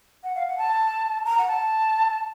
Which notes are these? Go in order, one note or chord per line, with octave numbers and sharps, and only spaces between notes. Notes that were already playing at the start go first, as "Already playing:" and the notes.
F#5
F5
F#5
A5
A#5
F#5
A5